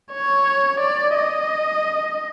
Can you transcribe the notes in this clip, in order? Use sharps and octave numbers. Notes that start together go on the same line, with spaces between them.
C#5
D5
D#5